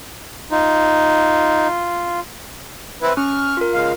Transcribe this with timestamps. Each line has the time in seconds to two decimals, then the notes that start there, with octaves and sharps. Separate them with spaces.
0.51 D#4 F4
3.02 C4 E4 B4
3.17 C#4 C#6 F6
3.57 F4 A#4
3.73 C#3 G#3 F5